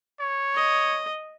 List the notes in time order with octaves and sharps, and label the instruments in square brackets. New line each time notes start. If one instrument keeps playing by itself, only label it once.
[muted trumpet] C#5
[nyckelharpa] D#5